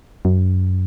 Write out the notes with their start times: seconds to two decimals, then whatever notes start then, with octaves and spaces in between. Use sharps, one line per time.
0.25 F#2